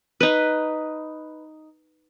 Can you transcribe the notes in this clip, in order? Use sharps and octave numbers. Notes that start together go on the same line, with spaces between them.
D#4 B4